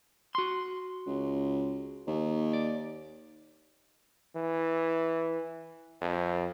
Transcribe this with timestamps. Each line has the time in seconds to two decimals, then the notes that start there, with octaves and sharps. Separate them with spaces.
0.35 F#4 C6
1.06 C#2
2.07 D#2
2.53 D5
4.36 E3
6.01 F2